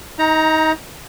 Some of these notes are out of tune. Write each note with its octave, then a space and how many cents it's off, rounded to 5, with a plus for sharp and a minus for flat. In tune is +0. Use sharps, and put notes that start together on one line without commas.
D#4 +25 A#5 +0